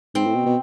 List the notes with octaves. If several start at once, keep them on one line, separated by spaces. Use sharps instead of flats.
G#2 C4
A2
B2
B2